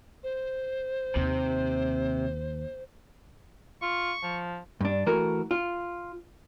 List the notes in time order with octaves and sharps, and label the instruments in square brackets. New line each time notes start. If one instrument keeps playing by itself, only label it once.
[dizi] C5
[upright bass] D#2 [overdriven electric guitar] C3
[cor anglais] F4 [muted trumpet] C#6
[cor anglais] F3
[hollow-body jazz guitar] G2 D4
E3 A3 F#4 A#4
F4